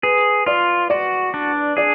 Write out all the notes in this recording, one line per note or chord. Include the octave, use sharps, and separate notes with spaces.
G#4 B4
F4 D5
F#4 D5
D4
G#4 D5